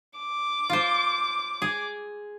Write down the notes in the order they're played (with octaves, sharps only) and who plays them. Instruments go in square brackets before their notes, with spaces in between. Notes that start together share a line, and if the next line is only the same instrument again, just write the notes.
[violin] D6
[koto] F4 C5
G#4